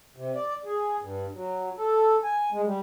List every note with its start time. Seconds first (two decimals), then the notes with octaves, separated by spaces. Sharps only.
0.16 C3
0.35 D5
0.65 G#4
1.01 G2
1.34 F#3
1.78 A4
2.24 G#5
2.52 G#3
2.66 G3